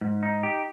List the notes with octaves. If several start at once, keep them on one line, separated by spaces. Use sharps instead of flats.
G#2
D#4
G4